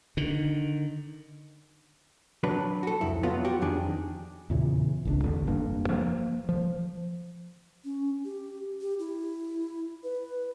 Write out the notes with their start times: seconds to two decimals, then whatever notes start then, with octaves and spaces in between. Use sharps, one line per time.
0.17 D3 D#3
2.43 F#3 D4 B4
2.83 F#4 A4
3.01 C2 F2 E4
3.23 F#3 B3 F4
3.45 F#4 G4
3.62 F2 D#3 D4 G#4
4.50 E2 A#2 C#3 E3
5.05 G#1 C#2 D4
5.23 A1 E2 D3
5.47 F1 G2 A#3 D4
5.90 F3 A#3
6.49 F3
7.85 C#4
8.25 G4
8.81 G4
8.99 E4
10.04 B4